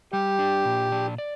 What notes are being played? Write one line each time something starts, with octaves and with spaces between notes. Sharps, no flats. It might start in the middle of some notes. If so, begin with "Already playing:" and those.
G3 G4
D4
A#2
D4
D5